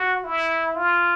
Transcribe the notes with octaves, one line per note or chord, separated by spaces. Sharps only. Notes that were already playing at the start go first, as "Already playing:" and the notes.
Already playing: F#4
E4
F4